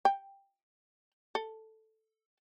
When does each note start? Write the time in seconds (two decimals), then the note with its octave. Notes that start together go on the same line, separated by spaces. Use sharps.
0.05 G5
1.35 A4